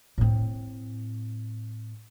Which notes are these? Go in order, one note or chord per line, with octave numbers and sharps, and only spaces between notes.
A2 C4